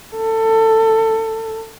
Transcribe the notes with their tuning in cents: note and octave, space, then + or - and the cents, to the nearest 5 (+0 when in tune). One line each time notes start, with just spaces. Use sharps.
A4 +20